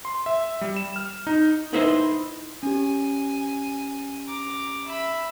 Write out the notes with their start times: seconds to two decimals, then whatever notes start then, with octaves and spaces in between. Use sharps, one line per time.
0.05 C6
0.26 E5
0.61 G3
0.77 E7
0.96 F6
1.27 D#4
1.73 D#4 E4 B4 C5 D#5 E5
2.63 C#4 G4 G#5
4.26 A#5 D6
4.86 E5 B5